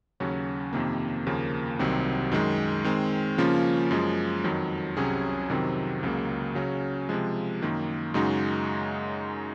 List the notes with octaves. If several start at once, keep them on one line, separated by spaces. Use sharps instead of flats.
D#2 C#3 F#3 C#4 F#4
F2 C3 D#3 A#3
D#2 C#3 F3 A#3
C2 C3 D#3 F#3 C4
F#2 D#3 G#3
D#3 G#3 C4
C#3 F3 A#3 C#4 F4
F#2 F3 G#3
F2 D#3 F#3
C2 C3 F#3 C#4 G#4
F2 C3 D#3 F#3 C4
C#2 C#3 F#3 A#3
C#3 F#3 C#4
C3 F3 G#3
F#2 D#3 A#3
F#2 C#3 G#3 D#4 F#4